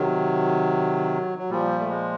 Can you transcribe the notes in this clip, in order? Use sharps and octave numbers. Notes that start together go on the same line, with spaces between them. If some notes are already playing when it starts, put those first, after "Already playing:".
Already playing: C3 D#3 F#3
F#3
A#2 F3 G3
A3
G#3